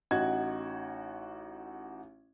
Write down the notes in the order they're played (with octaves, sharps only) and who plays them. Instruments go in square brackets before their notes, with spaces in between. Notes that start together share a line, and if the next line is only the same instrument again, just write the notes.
[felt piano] A1 D#4 F#4 F#5 G#6